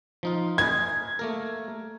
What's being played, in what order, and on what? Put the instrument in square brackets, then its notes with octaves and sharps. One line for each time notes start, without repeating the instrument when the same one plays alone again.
[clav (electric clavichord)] F3 D#4 F4
[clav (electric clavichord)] A#4 D#5 G#5 [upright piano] G#6
[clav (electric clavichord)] A3 A#3 A#4